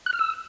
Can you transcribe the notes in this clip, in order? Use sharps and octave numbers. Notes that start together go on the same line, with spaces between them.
F#6
F6
E6